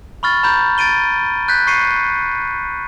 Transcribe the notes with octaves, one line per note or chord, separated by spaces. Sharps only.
B5 C#6 F6 A6
A#5 B5 G6
A6 D7 D#7 G7
F#6 G6 B6
C#6 C7 C#7 D#7